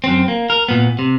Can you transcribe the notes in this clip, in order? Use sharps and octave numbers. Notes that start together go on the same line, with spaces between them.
F#2 C4
A#3
A#4
A#2 B3
C3